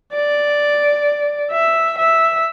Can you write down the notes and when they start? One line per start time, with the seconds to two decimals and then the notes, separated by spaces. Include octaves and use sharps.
0.13 D5
1.52 E5
1.98 E5